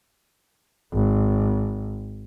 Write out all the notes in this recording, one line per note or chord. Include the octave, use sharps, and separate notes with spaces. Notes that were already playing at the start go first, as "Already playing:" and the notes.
G#1